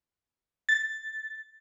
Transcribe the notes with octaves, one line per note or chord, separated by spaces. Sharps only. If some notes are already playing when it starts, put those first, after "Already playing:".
A6